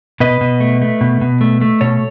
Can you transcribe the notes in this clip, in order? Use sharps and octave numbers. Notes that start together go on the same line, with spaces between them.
B2 B4 D#5
B2
A3
A3
B2
B2
A3
A3
B2 A4 C#5